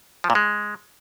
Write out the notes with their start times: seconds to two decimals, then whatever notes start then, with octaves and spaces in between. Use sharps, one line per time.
0.24 F3
0.30 A#2
0.35 G#3